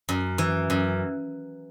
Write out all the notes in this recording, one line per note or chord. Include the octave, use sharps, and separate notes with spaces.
F#2
E3
F#2